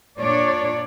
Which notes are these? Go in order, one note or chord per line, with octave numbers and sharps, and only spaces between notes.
A#2 D4 C#5 D5